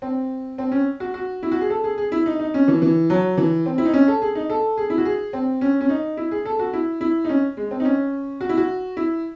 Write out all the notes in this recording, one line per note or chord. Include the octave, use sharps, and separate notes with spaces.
C4
C4
C#4
F#4
F#4
E4
F#4
G#4
A4
G#4
G#4
E4
D#4
D#4
C#4
E3
E3
F#3
E3
C4
E4
D#4
C#4
A4
G#4
D#4
A4
G#4
E4
F#4
G#4
C4
C#4
C#4
D#4
E4
G#4
A4
F#4
E4
E4
D#4
C#4
G#3
C4
D#4
C#4
F#4
E4
F#4
E4